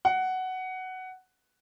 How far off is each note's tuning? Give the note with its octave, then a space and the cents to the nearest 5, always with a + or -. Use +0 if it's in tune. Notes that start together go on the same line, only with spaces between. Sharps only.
F#5 +10